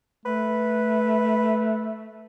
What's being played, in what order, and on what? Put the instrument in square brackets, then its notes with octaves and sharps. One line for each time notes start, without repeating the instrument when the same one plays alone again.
[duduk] A3 [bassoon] B4